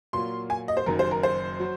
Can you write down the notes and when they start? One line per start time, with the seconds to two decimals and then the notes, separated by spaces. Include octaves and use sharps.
0.13 A#2 F#3 A#3 F4 C6
0.50 G#5
0.68 D#5
0.77 C5
0.86 F#1 F#2 D#3 A#4
0.99 C5
1.11 A#4
1.23 C5
1.59 F#3